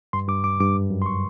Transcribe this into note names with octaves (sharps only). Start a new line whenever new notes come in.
G2 C6
G2 D6
G2 D6
G2 D6
F#2
F#2
C6
G3 C#6